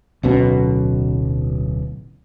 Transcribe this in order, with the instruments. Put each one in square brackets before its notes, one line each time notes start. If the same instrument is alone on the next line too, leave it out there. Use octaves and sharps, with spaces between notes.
[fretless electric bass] D1 B1 B2 C#4